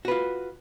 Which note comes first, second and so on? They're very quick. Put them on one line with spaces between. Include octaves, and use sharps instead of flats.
F#4 B4 F4